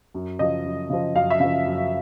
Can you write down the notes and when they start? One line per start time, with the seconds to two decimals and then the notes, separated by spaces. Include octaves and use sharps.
0.14 F#2
0.39 C#3 F3 D#5
0.65 F#2
0.90 C#3 F3
1.15 F#2 F5
1.30 E5
1.40 C#3 F3 F5
1.66 F#2